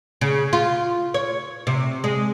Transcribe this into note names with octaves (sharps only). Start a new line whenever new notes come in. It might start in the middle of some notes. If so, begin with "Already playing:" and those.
C#3
F4
C#5
C3
G#3